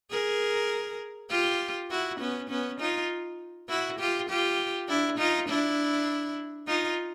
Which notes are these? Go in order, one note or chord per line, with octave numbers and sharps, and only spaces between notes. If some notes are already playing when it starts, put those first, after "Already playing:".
G#4 A#4
F4 G4
E4 F#4
B3 C#4
B3 C#4
D#4 F4
E4 F#4
F4 G4
F4 G4
D4 E4
D#4 F4
D4 E4
D#4 F4